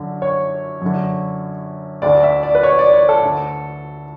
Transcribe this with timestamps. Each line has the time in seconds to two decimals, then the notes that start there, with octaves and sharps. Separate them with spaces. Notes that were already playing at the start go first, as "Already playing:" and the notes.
Already playing: F#2 D3
0.22 C#5
0.82 F#2 D3
2.02 D2 D3 D5
2.23 E5
2.43 D5
2.55 B4
2.63 C#5
2.79 D5
2.93 C#5
3.09 A4
3.23 D2 D3